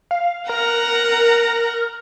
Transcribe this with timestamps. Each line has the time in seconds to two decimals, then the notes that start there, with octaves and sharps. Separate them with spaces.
0.11 F5
0.49 A#4 F#5 A#5